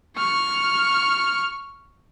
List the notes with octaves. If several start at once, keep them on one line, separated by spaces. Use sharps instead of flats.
C#6 F6